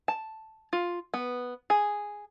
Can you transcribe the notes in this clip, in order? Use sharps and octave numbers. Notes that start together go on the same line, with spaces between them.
A5
F4
B3
G#4